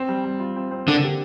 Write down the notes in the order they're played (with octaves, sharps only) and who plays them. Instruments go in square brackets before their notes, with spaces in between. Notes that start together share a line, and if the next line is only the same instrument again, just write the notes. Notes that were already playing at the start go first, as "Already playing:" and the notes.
Already playing: [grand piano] C4
G3
G3
F4
C4
C4
[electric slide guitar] D3 [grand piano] A#3
[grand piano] G4